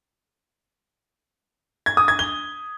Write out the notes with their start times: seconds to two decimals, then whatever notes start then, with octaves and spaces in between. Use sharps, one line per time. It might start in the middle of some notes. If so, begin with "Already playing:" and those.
1.86 G#6
1.97 D#6
2.08 G#6
2.19 G7